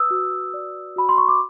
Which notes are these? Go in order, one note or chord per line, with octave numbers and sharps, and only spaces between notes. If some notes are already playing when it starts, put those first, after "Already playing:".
Already playing: B4 D#6 E6
F#4
D5
F#4 B5
C6
C#6
D6